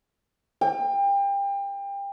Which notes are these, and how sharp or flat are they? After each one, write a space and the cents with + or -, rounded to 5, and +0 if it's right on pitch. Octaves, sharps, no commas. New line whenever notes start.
G5 +30